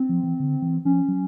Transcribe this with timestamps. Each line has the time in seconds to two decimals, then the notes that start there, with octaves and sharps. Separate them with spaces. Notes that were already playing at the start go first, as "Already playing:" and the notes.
Already playing: C4
0.09 F3
0.23 E3
0.40 D3
0.62 E3
0.85 F3 C#4
1.09 F#3